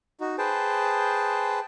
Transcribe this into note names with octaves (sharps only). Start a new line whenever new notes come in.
D#4 F#4
G#4 B4 C5 G5 A5